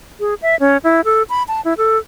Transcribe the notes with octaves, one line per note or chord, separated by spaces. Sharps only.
G#4
E5
C#4
E4
A4
B5
A5
E4
A4